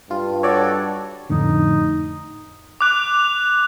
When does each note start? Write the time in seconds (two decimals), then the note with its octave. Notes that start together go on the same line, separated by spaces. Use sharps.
0.11 G2 F4
0.43 F#4 A4 C#5 D5
1.30 F2 A2 D3 D#4
2.81 D6 F#6 F7